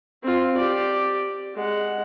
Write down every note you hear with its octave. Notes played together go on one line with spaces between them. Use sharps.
C4 F4
G4 D5
G#3 F#5